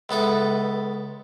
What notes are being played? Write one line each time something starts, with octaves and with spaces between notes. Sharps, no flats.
C#2 B3 A4 E5